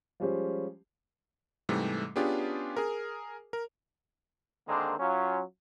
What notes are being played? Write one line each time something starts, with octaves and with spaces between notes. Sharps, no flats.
F3 G3 G#3 C#4 G4 C5
G#2 C3 E3 G3 A3
B3 C#4 D4 F4 G4 G#4
G#4 A#4
A#4
D3 D#3 G#3 A#3 C4 D4
F#3 C#4 F4